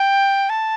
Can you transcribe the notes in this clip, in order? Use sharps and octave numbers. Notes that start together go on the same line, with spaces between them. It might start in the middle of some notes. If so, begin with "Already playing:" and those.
Already playing: G5
A5